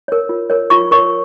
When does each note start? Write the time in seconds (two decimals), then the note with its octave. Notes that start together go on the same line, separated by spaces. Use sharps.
0.08 A#4 C#5
0.29 F4
0.50 A#4 C#5
0.70 F4 C#6
0.91 A#4 C#5 C#6